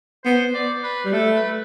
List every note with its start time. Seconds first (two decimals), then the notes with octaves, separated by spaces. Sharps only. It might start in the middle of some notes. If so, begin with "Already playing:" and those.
0.25 B3 C5
0.54 D5
0.83 B4
1.05 G3
1.13 A3 A4
1.35 B4